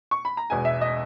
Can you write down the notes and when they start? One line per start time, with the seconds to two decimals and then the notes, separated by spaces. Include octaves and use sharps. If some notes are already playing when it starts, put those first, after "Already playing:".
0.11 C#6
0.25 B5
0.37 A#5
0.50 E1 E2 B2 G#3 G#5
0.65 E5
0.81 D#5